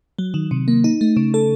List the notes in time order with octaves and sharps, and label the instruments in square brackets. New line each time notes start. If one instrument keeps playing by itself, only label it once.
[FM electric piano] F#3
D#3
C3
A#3
D#4
A3
C#3
A4